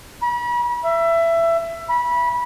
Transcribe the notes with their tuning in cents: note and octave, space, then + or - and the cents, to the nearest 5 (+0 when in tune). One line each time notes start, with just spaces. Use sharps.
B5 -40
E5 +20
B5 -20